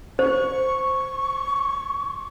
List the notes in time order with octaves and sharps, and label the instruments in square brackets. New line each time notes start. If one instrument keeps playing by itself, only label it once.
[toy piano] C5 [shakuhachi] C#6